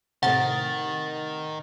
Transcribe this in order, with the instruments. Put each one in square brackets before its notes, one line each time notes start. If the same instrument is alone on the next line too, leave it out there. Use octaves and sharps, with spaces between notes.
[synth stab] A2 C3 [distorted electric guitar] D#3 [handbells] F#5 [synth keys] A6